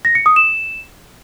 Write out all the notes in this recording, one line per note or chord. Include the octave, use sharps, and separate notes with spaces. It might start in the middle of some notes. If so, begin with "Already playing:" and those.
A#6
C#7
D#6
E7